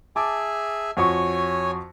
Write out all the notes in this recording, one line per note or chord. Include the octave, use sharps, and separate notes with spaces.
G#4 E5 G#5 A5 D6
F2 F#4 C#5 G#5 C#6